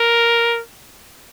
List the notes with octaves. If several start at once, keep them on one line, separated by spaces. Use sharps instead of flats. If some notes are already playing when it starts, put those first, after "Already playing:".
Already playing: A#4